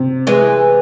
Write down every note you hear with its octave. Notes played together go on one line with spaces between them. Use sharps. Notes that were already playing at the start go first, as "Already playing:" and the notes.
Already playing: C3
E3 G#3